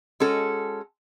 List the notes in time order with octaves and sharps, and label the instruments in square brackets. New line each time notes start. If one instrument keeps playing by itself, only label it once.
[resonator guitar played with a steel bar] G#3 C#4 F#4 A4